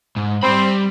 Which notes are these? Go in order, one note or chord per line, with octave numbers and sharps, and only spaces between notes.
G#2
G3 C4 B5